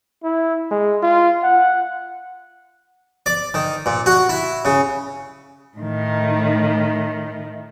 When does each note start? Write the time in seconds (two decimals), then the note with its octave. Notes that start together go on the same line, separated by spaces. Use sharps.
0.24 E4
0.71 G#3
1.03 F4
1.43 F#5
3.26 D5
3.54 D#3
3.86 A#2
4.06 F#4
4.29 E4
4.65 C#3
5.77 A2 D#3